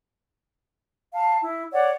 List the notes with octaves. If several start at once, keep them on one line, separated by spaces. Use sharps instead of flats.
F5 A5
E4
C#5 D5 F#5